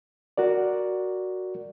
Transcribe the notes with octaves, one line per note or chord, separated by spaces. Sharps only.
F#4 A#4 D5